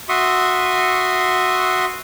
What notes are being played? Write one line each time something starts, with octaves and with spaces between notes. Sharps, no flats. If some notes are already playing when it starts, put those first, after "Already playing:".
F#4 E5 C6 C#6 D#6